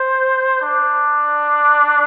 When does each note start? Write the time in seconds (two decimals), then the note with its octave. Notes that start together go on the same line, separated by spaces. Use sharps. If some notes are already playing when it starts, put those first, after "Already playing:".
Already playing: C5
0.62 D4